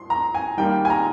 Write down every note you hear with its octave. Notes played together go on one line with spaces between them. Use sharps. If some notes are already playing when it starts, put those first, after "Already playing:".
Already playing: C6
A#5
G#5
D#3 G3 A#3 G5
G#5
A#5